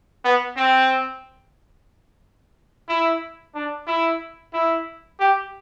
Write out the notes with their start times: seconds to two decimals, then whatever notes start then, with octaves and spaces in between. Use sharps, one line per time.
0.24 B3
0.56 C4
2.88 E4
3.55 D4
3.87 E4
4.53 E4
5.20 G4